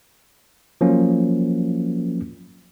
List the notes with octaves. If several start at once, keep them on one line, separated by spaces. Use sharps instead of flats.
F3 F#3 A#3 C#4